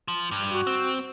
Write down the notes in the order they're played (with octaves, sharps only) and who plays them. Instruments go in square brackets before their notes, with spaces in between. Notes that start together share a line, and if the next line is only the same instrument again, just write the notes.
[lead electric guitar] F3
G2
[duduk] F#4
[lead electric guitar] C4